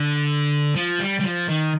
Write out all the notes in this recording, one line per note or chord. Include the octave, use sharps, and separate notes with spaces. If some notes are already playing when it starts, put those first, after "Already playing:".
Already playing: D3
F3
G3
G3
F3
D#3